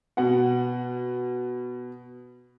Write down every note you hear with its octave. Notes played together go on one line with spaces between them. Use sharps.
B2 F#5